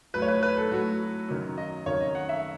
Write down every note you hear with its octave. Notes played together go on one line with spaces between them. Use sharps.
A2 F#3 B4
C#5
B4
B4
A4
A2 F#3 F#4
F#2 D#3 F#3
D#5
F#2 D#3 F#3 C#5
D#5
F#5
E5